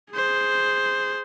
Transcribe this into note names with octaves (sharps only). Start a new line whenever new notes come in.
G#4 C5